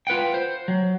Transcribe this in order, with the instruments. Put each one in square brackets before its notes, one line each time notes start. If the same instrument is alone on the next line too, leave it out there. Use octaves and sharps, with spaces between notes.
[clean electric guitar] F4 B4 F#5 G5
C5
F#3